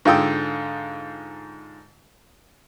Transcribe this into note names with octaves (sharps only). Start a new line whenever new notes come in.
G#2 D3 F4 G5 D#6 E6